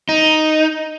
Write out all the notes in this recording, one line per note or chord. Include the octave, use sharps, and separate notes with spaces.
D#4